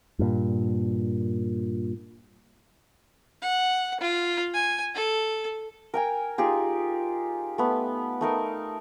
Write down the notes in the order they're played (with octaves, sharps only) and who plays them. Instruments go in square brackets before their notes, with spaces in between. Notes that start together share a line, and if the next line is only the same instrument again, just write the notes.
[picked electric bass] G2 A#2
[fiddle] F#5
F4
G#5
A4
[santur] A#4 G5 G#5
D#4 F4 G4 G#4
A3 B3
A3 D#4 A#4